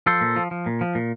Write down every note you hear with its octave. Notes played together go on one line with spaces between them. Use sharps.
F3 A4 C5
A#2
F3
F3
A#2
F3
A#2